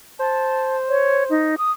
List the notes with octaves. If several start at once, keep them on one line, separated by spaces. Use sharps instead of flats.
C5 A5
C#5
D#4
D#6